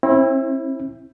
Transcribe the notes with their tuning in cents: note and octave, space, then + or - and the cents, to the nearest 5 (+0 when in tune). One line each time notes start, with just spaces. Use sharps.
C4 +40 E4 -5